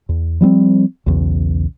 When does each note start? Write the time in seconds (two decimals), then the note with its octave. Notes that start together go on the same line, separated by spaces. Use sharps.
0.09 E2
0.41 F3 G3 B3 C4
1.06 B1 E2 C#3